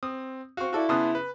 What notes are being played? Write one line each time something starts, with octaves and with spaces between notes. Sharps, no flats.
C4 D#6
C4 F#4 F5 C#6
E4 F#4 A4 D5
C#3 B3 A5 C6 D#6 F#6
B4